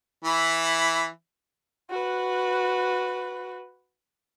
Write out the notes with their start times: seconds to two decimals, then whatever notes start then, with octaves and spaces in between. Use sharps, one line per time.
0.24 E3 E4
1.90 F#4 B4